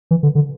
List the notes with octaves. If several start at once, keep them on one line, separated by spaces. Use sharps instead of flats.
E3
D3
D3